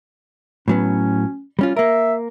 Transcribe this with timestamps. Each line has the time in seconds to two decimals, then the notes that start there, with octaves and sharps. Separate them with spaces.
0.68 A2 F#3 B3 C#4
1.59 G3 C#4 F4
1.77 A#3 A#4 E5